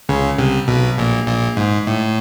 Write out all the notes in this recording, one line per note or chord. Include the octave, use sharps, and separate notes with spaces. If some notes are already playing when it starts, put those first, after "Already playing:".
C#2 C#3
C2 C3
B1 B2
A#1 A#2
A#1 A#2
G#2
A2